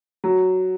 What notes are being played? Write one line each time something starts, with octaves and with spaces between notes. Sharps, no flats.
F#3